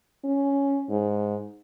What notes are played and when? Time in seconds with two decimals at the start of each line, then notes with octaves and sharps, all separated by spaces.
0.25 C#4
0.90 G#2